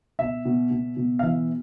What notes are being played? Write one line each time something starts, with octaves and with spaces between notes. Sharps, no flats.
B2 E5
B2
B2
B2
F5
E3 E5